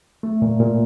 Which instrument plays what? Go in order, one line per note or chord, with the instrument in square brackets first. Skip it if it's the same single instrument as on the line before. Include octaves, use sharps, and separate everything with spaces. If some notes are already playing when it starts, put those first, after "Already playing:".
[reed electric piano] A3
A#2
A#2